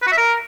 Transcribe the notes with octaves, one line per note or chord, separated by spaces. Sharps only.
B4
F#4
E5
A#4